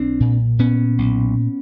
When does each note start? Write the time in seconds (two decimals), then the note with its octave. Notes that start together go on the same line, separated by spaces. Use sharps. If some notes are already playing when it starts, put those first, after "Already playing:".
Already playing: B1 C4 D4
0.20 A#2
0.59 A#2 B3 C#4
0.98 B1